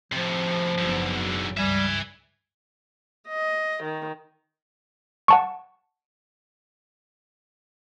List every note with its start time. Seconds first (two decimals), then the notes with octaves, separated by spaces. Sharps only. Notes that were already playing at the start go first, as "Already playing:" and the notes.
0.12 A2 C3 F3
0.78 F#1 G#2 D3 F#3 B3
1.58 C#2 G2 G3 E5 G#5
3.28 D#5
3.82 D#3
5.28 F#5 A5 C#6